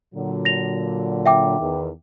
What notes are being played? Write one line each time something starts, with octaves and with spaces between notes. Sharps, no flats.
A#2 D3 F#3
A#6 F7
E5 G5 D6
E2 D#3